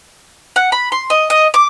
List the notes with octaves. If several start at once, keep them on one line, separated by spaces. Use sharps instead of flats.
F#5
B5
C6
D#5
D#5
D6